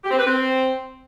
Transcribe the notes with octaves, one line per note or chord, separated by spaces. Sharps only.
G4
C4
B4
C4